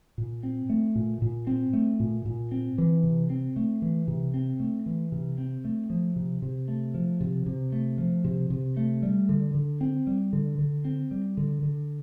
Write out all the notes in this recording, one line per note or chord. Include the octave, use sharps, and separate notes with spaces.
A#2
C4
A3
A#2
A#2
C4
A3
A#2
A#2
C4
E3
C3
C4
A3
E3
C3
C4
A3
E3
C3
C4
A3
F3
C3
C3
A3
F3
C3
C3
A3
F3
C3
C3
A3
G3
D3
D3
C4
G3
D3
D3
C4
G3
D3
D3